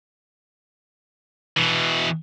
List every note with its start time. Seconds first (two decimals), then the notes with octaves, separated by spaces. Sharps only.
1.57 B2 E3